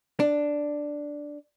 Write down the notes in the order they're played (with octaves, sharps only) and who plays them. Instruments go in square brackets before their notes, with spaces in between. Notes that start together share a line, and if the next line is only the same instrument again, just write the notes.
[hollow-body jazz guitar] D4